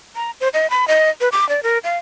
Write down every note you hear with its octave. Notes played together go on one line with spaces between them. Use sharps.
A#5
C5
D#5
B5
D#5
B4
D6
D5
A#4
F5